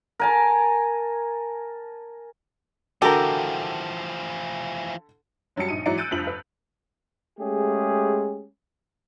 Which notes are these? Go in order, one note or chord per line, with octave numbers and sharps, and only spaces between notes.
A#4 G#5 A5
D3 E3 F3 F#4 G4 A4 A#4 A5
F#2 F#3 G3 A5 C#7
A#1 D#4 D#7
G#2 E3 F#3 D5 A#5 C#7
E6 F#6 G6 A6 D7 D#7
F1 G2 F3 F7 F#7
B4
G#3 A3 C#4 G4 G#4